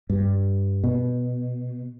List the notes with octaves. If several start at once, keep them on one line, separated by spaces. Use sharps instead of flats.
G2
B2